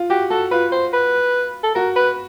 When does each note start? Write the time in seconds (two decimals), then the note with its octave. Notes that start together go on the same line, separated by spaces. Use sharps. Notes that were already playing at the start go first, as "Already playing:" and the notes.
Already playing: F4
0.10 F#4 G4
0.30 F#4 A4
0.51 F4 B4
0.72 C5
0.93 B4
1.63 A4
1.75 F#4 A#4
1.96 B4